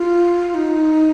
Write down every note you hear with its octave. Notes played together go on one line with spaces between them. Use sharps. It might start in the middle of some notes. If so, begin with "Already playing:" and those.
Already playing: F4
D#4